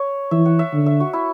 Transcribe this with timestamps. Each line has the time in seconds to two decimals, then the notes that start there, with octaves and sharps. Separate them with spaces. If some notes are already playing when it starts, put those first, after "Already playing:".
Already playing: C#5
0.31 E3 E5
0.46 F#5
0.59 E5
0.73 D3
0.86 E5
1.00 F#4
1.13 E4